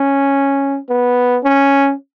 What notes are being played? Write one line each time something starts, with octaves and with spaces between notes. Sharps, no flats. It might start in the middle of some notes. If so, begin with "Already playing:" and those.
Already playing: C#4
B3
C#4